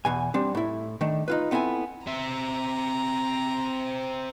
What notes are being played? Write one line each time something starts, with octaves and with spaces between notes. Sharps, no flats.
E2 B2 G#5
G3 C4 D4
A2 E4
D#3 A3 D4
D#4 F4 B4
B3 C4 E4 A4 G#5
C4 E5 A#5